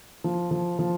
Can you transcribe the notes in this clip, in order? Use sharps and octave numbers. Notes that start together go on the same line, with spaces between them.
F3
F3
F3